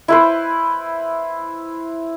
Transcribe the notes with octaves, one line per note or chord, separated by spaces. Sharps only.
E4 B4 C5